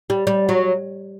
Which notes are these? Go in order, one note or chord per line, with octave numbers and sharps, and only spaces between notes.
G3
G3
F#3